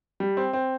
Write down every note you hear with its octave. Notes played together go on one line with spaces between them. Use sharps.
G3
C4
C4